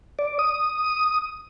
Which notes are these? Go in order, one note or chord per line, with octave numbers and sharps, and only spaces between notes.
D5
D#6